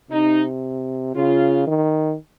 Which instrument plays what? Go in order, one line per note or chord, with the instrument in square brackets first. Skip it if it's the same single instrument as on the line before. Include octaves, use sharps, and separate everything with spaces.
[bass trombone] C3 [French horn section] D#4
[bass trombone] C#3 [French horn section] F4
[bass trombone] D#3